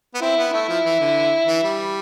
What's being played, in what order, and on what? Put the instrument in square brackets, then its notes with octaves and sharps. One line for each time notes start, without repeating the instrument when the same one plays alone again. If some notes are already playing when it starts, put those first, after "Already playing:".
[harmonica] B3
[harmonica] C4 [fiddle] E4
[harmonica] B3
[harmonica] A3 [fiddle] E4
[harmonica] F3
E3
D3
E3
G3